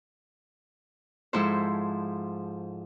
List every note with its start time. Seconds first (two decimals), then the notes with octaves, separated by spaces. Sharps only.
1.33 G#2 F3 E4 A4 C5